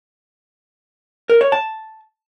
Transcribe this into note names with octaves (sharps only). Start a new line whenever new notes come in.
A#4
C#5
A5